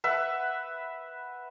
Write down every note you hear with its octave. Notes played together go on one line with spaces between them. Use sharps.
B4 E5 F#5